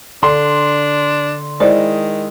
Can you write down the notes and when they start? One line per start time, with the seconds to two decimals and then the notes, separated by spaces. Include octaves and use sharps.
0.23 D3 D4 C6
1.60 D#3 G#3 E4 C5 D5